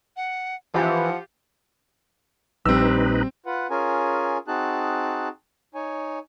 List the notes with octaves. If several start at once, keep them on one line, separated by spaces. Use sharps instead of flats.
F#5
E3 F3 F4 G4 F#5
A#1 G3 C4 D#4 B4 E6
F4 B4 F#5
C#4 F4 G#4 A#4 G#5
C4 D#4 F#4 G#4 A5 F#6
D#4 C#5 G#5